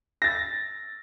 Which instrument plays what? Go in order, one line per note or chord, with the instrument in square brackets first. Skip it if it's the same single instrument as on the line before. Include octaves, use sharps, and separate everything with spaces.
[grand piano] A6 A#6